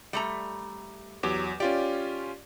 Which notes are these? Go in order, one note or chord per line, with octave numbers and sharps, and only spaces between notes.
G3 A3 A#5
E2 F#3 G4
C#4 F4 G4 D5